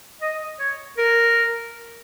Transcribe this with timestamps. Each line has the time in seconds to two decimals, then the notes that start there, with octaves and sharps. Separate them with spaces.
0.21 D#5
0.60 C#5
0.98 A#4